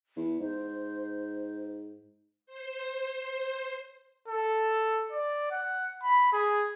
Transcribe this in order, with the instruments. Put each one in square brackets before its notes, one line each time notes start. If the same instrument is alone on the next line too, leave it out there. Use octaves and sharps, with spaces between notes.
[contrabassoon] E2
[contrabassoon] G#2 [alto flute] C5
[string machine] C5
[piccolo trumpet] A4
D5
F#5
B5
G#4